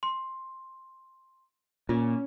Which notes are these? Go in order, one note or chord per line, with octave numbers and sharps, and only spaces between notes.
C6
A#2 C#4 F4